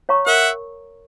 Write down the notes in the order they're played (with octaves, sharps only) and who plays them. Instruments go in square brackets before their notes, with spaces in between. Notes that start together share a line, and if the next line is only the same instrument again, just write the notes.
[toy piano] C#5 F5 A#5 C#6
[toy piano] A#4 [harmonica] E5 F#5